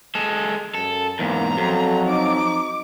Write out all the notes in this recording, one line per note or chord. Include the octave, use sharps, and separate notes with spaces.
G#3 A4
F#2 A4
E2 G#2 A#3 A#5
F2 F#3 A4
D#4 D6